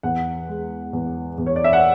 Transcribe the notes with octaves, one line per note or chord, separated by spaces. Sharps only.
E2 F#5
G#3
E2
E2
C#5
D5
E5
F#5